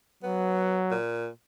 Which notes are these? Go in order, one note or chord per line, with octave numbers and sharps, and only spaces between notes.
F#3 B3
A#2